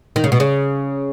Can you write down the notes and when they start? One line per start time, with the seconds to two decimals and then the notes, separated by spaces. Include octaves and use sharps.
0.16 D#3
0.24 C#3
0.32 B2
0.40 C#3